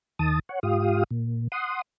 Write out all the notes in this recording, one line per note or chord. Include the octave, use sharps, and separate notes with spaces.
D#2 D#3 A5 D#6
C#5 F#5
G#2 F4 G4 F5 D#6
A#2
F#5 C6 D#6